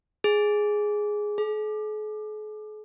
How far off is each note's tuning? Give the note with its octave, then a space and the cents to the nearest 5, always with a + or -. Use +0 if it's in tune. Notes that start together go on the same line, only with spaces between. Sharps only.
G#4 +5
G#4 +45